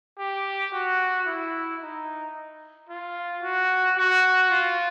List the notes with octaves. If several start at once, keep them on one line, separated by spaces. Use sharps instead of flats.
G4
F#4
E4
D#4
F4
F#4
F#4
F4